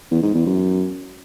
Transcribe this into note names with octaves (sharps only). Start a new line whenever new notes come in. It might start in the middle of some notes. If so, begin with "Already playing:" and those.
E2
G#2
E2
F#2